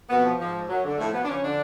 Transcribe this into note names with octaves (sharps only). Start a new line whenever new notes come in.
F2 B2 B3
F3
G#2 F3
G#2
F#2 F#3
D3
A2 F3 A3
B2 F3 B3
D4
C#3 F3 C#4
D3 D4